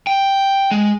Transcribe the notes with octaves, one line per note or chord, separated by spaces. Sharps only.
G5
G#3